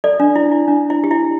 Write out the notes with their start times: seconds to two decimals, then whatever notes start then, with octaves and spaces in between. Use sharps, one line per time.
0.04 A4 D5
0.20 D4
0.36 E4
0.52 E4
0.68 D4
0.90 E4
1.04 G4
1.11 E4